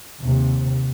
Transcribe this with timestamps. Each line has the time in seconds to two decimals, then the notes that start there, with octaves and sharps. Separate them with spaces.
0.21 D#2 C3